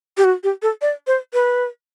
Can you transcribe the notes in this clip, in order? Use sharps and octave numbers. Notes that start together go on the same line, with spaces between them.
G4
F#4
G4
A4
D5
C5
B4